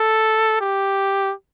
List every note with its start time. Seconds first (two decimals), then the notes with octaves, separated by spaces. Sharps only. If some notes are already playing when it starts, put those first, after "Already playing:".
Already playing: A4
0.61 G4